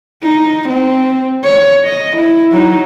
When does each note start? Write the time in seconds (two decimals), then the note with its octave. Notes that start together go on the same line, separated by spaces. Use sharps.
0.22 D#4
0.68 C4
1.44 C#5
1.85 D#5
2.17 E4
2.52 F#3 D#4